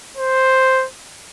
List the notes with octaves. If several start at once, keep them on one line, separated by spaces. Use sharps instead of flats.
C5